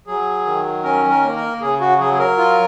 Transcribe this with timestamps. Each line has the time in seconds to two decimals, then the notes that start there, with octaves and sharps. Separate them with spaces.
0.07 F#3 G#4
0.46 D#3
0.84 C#4 A#4
1.10 A#4
1.23 A#3
1.36 A#4
1.61 C#3 G#4
1.80 F#4
1.99 F#3 G#4
2.14 G#4
2.19 A#4
2.38 F4